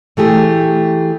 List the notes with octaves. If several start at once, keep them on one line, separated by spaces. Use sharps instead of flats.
E3 A3 G4 G#4